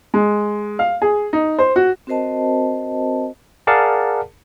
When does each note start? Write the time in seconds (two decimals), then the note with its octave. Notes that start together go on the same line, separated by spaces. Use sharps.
0.14 G#3
0.79 F5
1.02 G#4
1.33 D#4
1.59 C5
1.76 F#4
2.07 C4 F#4 A#4 C5 D#5 A5
3.67 G#4 A#4 D5 F5 F#5 A5